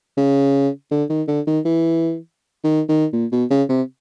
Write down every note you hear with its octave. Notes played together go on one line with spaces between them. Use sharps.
C#3
D3
D#3
D3
D#3
E3
D#3
D#3
A#2
B2
C#3
C3